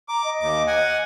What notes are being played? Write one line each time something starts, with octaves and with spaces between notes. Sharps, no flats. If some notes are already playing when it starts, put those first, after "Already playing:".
A#5 D6
D#5
D#2 D6
F#5 G#5